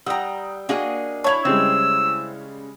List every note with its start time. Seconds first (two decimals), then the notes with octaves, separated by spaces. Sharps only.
0.06 G3 F#5 G5 A#5 D#6 E6
0.69 A#3 D4 F#4 G#4 D#5
1.24 E4 C#5 A5 G#6 F7
1.45 C#3 G3 G#3 C4 E6